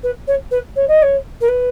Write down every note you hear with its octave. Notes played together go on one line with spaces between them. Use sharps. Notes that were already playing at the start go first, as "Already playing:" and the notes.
B4
C#5
B4
C#5
D#5
C#5
A#4
B4